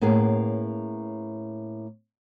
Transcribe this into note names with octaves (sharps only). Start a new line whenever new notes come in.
A2 A#3 B3 C#4 G#4